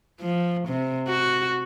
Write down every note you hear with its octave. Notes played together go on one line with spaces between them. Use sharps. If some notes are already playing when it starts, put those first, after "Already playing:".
F3
C3
F#4